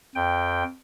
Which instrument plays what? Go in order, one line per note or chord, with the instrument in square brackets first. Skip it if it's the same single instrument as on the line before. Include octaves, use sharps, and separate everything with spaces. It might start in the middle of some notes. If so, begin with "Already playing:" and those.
[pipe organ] F2 G5